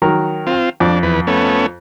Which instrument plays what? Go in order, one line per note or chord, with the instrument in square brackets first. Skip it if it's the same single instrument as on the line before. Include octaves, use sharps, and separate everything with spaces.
[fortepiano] D#3 F#3 A#4
[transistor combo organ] C4 F4
[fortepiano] F2 [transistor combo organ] D4
[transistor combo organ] E2 B4
A3 B3 C#4